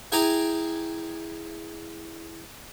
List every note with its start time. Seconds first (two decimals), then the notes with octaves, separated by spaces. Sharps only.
0.12 E4 G#4 G5 G#5 A#5 D6